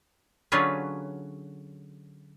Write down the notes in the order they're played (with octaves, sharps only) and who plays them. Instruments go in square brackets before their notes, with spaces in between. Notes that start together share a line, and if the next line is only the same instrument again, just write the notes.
[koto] D3 F#3 C#4 F4 G#4 B4